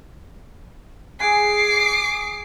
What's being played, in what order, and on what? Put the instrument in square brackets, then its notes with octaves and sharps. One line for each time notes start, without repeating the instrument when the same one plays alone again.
[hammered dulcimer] G#4 F#5 G#5 [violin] D6 C7